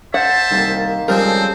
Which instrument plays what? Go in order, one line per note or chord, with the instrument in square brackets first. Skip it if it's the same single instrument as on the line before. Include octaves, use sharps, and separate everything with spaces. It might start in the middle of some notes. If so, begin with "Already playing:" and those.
[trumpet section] C5 E5 A5 [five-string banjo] F#5
[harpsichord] C2 [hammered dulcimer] D#3 A#3
[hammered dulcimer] C#3 A4 [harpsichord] F3 G3 G#3 [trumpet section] C4 C5 [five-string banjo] A#4